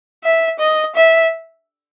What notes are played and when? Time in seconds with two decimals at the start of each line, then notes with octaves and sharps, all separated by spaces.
0.24 E5
0.59 D#5
0.95 E5